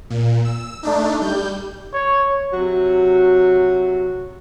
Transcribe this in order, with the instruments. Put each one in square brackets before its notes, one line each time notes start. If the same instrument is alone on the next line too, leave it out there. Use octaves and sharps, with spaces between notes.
[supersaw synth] A#2
E6
A3 D4 D#4
G3 G6
[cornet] C#5
[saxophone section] C3 F#3 F#4